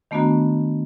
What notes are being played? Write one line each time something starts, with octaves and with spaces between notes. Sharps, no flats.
D#3 A3 B3 D4 F#4 A#5